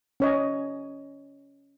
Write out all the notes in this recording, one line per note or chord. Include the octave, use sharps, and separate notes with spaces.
C#4 C#5 D#5